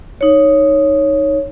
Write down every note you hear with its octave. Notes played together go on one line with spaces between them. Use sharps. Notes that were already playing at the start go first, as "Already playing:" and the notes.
D#4 C#5